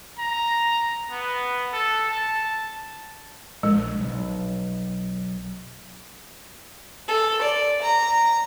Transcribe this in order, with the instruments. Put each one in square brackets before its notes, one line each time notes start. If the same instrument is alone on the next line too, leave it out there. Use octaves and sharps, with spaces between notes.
[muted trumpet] A#5
B3
A4
A5
[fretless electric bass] A#1 [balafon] G#3
[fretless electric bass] B1
[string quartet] A4
D5
A#5